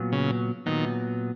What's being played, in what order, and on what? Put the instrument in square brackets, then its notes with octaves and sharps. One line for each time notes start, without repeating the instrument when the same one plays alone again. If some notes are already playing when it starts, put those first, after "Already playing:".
Already playing: [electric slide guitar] A#2 F#3 B3
[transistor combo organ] C#3
[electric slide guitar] A#2 F#3 B3 [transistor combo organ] D#3